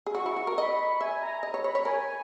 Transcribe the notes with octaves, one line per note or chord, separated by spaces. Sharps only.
G#4
F#4 C#6
E4
F#4
A#4
D#5 B5
E5 G#5
A#5
D#5
C#5
C#5 B5
C#5
A#4 G#5